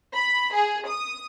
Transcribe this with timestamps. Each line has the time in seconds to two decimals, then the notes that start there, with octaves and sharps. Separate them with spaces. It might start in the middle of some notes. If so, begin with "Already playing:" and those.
0.15 B5
0.54 G#4
0.87 D#6